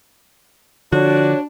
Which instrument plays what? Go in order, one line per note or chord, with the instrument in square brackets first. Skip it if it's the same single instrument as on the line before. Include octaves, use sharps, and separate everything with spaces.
[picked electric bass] D3 F3 [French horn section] D4 [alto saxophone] F#4 [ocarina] C#5